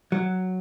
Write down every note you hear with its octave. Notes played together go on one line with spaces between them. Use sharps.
F#3